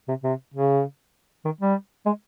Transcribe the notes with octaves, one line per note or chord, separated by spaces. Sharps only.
C3
C3
C#3
D#3
G3
G#3